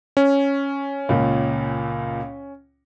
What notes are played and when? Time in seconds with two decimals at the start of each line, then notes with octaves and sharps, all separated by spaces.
0.17 C#4
1.09 C#2 A#2